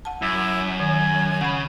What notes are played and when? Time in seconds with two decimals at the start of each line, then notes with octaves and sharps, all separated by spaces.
0.05 F#5 A5
0.22 F#2 E4
0.80 D#3 G#5
1.41 C#3 F#5 B5